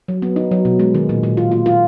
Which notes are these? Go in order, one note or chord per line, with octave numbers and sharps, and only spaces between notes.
F#3
B3
D#4
F#3
B2
G#3
D#3
A#2
A#2
F4
F4
F4